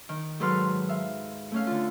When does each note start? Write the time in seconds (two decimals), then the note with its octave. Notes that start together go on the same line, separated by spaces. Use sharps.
0.09 D#3
0.40 G#2 F#3 A4 B4 C6 F6
0.89 E5 F5
1.52 A3 C#4 F5
1.67 D3 F4